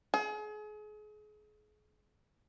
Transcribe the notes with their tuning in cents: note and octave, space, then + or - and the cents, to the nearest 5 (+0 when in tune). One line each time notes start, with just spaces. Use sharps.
G#4 +35